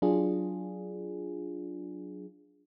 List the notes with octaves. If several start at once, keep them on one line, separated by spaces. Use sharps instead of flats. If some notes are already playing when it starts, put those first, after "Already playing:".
F#3 D4 F4 G#4